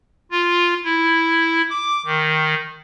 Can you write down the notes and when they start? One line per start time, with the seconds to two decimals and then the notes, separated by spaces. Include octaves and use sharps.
0.31 F4
0.84 E4
1.70 D6
2.06 D#3